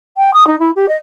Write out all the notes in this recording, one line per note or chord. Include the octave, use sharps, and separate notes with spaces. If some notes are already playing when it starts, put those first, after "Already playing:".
G5
D#6
D#4
E4
G4
D#5